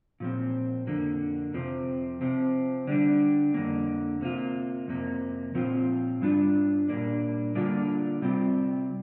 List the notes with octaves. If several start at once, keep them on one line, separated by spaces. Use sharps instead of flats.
A#2 F3 C4
F2 D3 A#3
F2 C3 F3 C4
C3 F3 C4
D3 G3 D4
F2 D3 F3 A#3
C3 A#3 F4
F2 C3 A#3
A#2 F3 C4 F4
G2 G3 D4 F4
A#2 G3 A#3 D4
D3 G3 A#3 D4 F4
C3 G3 C4 F4